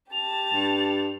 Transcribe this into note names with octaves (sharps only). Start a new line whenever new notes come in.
G4 A5 F7
G2